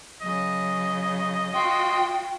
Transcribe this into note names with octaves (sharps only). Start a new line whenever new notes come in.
C#3 F#3 D#5
F4 F#4 G5 C6